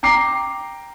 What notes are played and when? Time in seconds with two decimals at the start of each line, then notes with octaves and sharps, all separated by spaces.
0.03 G5 A#5 D6 C7